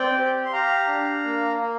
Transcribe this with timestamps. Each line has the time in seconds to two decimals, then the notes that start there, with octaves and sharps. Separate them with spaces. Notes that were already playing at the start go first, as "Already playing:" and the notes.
Already playing: C4 D5 G5
0.17 G4
0.45 C6
0.52 G4 F5 A#5
0.88 D4
1.24 A#3
1.59 A#3